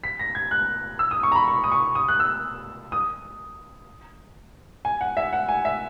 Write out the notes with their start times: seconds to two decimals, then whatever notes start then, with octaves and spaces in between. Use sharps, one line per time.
0.04 B6
0.19 A#6
0.35 G#6
0.51 F#6
0.99 E6
1.11 D#6
1.23 C#6
1.32 A#5
1.36 B5
1.48 C#6
1.64 D#6
1.72 C#6
1.95 D#6
2.08 F#6
2.20 E6
2.92 D#6
4.85 G#5
5.01 F#5
5.17 E5
5.33 F#5
5.49 G#5
5.65 E5